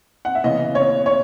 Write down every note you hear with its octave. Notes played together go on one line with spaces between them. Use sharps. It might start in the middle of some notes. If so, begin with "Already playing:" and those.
F#5
E5
C#3 E3 B3 D#5
C#5
C#5